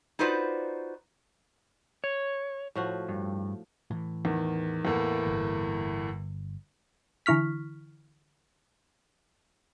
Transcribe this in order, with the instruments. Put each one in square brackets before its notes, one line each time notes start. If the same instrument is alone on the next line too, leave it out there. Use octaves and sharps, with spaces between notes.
[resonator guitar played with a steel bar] D#4 F4 F#4 B4 C5 D5
[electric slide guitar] C#5
[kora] A2 F3 F#4
[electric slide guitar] G2
[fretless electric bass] A2 E3
[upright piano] E2 D#3
E2 A2 A#3
[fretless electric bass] G1
[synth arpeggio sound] D3 E3 E4 C#6 F6 B6